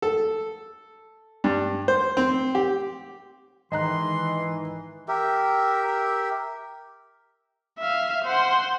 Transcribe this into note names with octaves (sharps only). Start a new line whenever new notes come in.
A4
G2
C5
C4
G4
G#2 D#3 E3 D#5 A#5 C6 F#6
G4 A#4 E5
E5 F5
C5 F#5